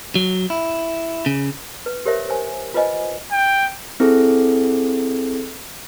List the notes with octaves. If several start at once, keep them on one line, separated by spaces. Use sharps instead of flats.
F#3
E4
C#3
B4
G4 A#4 C5 C#5 E5
C5 G#5
F4 B4 C5 D#5 G#5
G5
C4 E4 G#4 A4